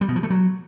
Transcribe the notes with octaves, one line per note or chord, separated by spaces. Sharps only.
G3
B2
F3
A3
F#3